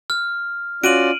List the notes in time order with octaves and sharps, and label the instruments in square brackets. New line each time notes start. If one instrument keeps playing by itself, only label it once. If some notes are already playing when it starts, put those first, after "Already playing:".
[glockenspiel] F6
[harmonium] C#4 F4 D5 [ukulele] F#4 [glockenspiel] D7 D#7 F#7